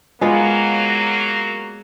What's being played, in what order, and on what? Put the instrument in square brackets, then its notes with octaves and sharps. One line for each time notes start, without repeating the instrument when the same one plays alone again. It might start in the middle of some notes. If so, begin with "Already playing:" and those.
[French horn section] F#3 A#3 [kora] G#3 B3 F4